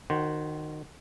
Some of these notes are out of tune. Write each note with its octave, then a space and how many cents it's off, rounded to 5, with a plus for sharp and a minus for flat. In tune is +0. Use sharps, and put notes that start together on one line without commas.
D#3 -25 F#4 +0 C5 +0